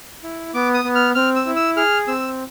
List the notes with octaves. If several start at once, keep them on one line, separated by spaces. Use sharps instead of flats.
E4
B3 D6
D#6
B3
F6
C4 F6
E6
E4
E6
G#4 F6
C4 E6